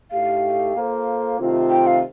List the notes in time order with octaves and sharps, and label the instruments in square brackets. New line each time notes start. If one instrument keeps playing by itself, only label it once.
[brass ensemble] A2 A3 D#4 G4 [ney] F5
[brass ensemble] A#3 F4 A4 C5
C3 D#3 A3 C4 F4
[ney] G5
F5